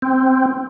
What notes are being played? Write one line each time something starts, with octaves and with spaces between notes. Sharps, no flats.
C4